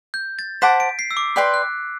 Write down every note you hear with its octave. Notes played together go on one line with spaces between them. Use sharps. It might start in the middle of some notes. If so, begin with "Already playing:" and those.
G6
A6
C5 F#5 A5 D6 B6
D7
C7
E6
D6
B4 D5 G5 C6 F#6
F#6